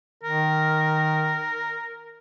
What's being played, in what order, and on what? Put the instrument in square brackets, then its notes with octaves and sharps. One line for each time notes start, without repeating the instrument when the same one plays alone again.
[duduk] D#3 [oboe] A#4